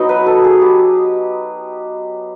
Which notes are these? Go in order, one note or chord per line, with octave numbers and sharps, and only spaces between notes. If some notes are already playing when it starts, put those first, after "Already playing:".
Already playing: F#3 B3 D#4
B4
A4
G#4
G4